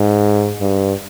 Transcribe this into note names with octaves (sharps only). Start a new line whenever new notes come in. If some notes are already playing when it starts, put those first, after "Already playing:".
Already playing: G#2
G2